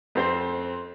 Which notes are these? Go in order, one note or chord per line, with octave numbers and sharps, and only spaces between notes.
F2 C4 C5